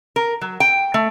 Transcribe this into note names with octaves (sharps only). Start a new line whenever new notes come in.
A#4
F#3
G5
A3